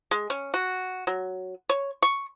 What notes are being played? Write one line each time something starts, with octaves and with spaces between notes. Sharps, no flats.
G#3
C#4
F#4
F#3
C#5
C#6